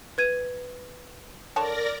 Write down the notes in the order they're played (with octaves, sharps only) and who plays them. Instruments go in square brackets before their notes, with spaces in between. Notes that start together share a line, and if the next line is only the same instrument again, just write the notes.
[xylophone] B4 G#6 D#7
[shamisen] D3 C#5 A5 [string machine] A#4 D5 A#5